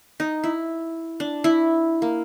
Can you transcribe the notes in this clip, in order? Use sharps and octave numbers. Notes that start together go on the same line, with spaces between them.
D#4
E4
D4
E4
A#3